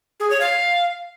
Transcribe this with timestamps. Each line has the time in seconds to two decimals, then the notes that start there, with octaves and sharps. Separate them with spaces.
0.20 G#4
0.30 C#5
0.41 F5